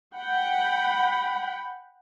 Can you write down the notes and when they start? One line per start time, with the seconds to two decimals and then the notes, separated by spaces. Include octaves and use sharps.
0.15 F#5 G5 B5